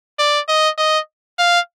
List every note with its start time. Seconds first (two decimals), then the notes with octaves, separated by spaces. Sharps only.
0.19 D5
0.48 D#5
0.78 D#5
1.39 F5